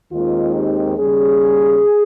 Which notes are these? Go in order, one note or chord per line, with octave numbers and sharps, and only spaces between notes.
D#2 D#3 G#3 C4 D#4 F4
G4
D#2 C#3 G3 C#4 G#4